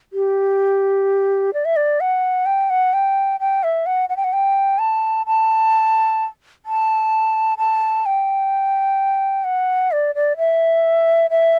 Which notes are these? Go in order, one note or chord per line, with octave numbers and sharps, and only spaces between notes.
G4
D5
E5
D5
F#5
G5
F#5
G5
G5
E5
F#5
F#5
G5
F#5
G5
A5
A5
A5
A5
G5
F#5
D5
D5
E5
E5